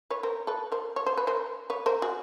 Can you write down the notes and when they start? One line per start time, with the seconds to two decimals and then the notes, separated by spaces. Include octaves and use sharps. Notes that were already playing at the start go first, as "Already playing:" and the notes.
0.10 B4 C#5
0.23 A#4 C5
0.47 A4 B4
0.72 A#4 C5
0.96 C#5
1.06 C5
1.17 B4
1.27 A#4 C5
1.70 B4 C#5
1.86 A#4 C5
2.02 F#4 G#4